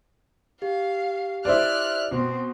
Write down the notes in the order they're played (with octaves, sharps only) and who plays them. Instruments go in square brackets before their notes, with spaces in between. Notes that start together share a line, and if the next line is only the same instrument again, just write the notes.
[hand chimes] G4 [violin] F5
[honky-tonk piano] E4 C5 D5 [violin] F6 F#6
[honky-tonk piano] B2 [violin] C4